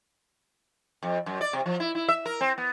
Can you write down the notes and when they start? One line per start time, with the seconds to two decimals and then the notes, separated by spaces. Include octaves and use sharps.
1.03 F2
1.26 F#2
1.41 D5
1.53 C3
1.66 F3
1.80 E4
1.95 E4
2.09 E5
2.26 A#4
2.41 C4
2.58 B3